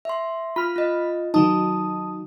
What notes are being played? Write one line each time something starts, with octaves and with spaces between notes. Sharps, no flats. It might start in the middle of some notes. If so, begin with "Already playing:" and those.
E5 C6
F4 B5 F6
F4 D#5
D#3 F#3 D#4 A5 D#6